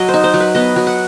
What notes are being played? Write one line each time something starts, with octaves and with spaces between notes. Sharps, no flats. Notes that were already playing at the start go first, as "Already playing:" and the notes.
Already playing: F#3 D#5
C5
D#4
C5
F#3
B4
B3 D#5
F#3
F#5